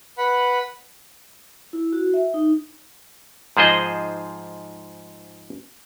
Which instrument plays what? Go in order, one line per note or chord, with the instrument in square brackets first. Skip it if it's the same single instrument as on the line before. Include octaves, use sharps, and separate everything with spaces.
[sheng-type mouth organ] B4 F#5 B5
[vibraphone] E4
F#4
E5
D#4
[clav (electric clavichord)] G#2 F3 G#4 C5 D#5